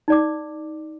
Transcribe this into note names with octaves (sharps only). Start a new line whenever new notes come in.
D#4 D5 D6